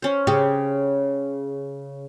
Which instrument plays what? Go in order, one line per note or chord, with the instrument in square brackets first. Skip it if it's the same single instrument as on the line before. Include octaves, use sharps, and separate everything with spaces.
[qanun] C#4 C5
[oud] C#3 [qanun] G4